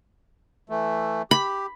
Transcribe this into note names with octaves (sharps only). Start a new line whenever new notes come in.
E3 A3
G4 B5